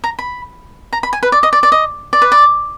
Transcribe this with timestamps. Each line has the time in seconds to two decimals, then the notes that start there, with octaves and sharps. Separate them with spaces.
0.04 A#5
0.19 B5
0.93 A#5
1.03 B5
1.13 G#5
1.23 B4
1.32 D5
1.43 D#5
1.53 D5
1.63 D5
1.72 D#5
2.13 D5
2.22 B4
2.32 D5